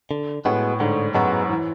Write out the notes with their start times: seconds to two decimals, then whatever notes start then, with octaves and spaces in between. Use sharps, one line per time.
0.11 D3
0.45 A2 G#3 B3 F#4
0.80 G#2 D3
1.14 F#2 G#3 B3 F#4
1.49 E3